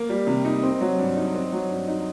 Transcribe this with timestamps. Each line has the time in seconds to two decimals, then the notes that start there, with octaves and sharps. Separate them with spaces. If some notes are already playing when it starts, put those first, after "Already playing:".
Already playing: A#3
0.09 G3
0.27 C3
0.45 D#4
0.63 C4
0.81 F#3
0.99 G2
1.16 D#4
1.35 C4
1.52 F#3
1.70 G2
1.88 D#4